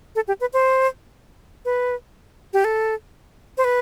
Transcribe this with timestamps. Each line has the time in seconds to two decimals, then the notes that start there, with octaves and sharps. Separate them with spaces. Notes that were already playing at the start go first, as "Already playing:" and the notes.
0.15 A4
0.28 G4
0.41 B4
0.53 C5
1.65 B4
2.53 G4
2.64 A4
3.58 C5
3.64 B4